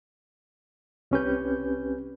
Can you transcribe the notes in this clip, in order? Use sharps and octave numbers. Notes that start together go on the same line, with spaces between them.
C2 C4 C#4 G4 B4 G6